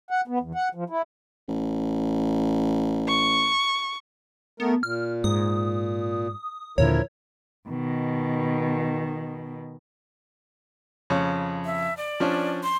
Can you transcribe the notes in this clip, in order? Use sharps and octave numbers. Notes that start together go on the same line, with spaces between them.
F#5
B3
E2
F#5
F3
E4
A1
C#6
A3 B3 A#4
A#2 F6
G#2 D#6
D#2 A#2 D3 F3 E4 A#4 C#5
B2 D#3
F2 C#3 C#5
E5
D5
F3 C#4 D4
C6